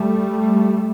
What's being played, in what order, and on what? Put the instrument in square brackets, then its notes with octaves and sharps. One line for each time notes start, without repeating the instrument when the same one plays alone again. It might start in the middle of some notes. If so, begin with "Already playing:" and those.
Already playing: [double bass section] G3 A3